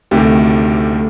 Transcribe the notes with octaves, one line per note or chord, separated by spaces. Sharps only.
D2 C3 D#3 A3 G4
A3